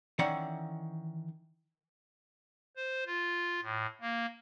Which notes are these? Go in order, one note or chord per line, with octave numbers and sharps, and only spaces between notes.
D#3 E3 C#4 D5 E5 F#5
C5
F4
A2
A#3